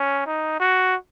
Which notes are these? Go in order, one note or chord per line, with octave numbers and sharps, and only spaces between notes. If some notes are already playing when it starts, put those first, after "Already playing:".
Already playing: C#4
D#4
F#4